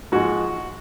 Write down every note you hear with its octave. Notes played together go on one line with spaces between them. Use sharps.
G#2 F3 G#3 F#4